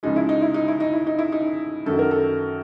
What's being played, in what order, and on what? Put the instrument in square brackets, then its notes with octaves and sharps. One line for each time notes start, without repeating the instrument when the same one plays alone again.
[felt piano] C#2 C#3 F3 G#3 D#4
E4
D#4
E4
D#4
E4
D#4
E4
D#4
E4
D#4
F#2 D#3 F#3 A4
A#4
A4